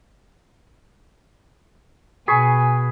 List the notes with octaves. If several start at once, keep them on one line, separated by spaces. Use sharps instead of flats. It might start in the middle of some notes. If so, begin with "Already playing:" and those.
B2 G#4 G#5 B5 C#6